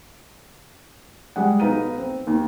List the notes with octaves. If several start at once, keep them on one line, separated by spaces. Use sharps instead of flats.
G3 G#3 F#5
B1 D#4 B4 F5 A#5 D#7
C4
D#2